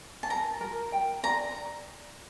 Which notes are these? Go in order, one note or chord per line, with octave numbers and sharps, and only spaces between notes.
A5
A#4 A#5
A#4
G5
D5 A#5